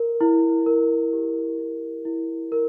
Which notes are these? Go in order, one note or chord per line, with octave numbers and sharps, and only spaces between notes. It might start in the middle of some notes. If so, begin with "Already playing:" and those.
Already playing: A#4
E4
A#4
G4
E4
E4
A#4